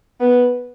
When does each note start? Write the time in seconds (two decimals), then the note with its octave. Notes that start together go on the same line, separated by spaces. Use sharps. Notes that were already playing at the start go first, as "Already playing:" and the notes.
0.20 B3